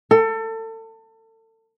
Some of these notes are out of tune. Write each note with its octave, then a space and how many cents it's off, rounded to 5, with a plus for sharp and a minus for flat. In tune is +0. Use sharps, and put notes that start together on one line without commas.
A4 +30